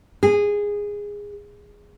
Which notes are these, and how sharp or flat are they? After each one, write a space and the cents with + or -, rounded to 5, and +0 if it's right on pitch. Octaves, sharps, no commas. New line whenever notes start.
G#4 -15